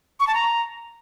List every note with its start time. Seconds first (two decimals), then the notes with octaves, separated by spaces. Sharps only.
0.20 C#6
0.27 A5
0.34 A#5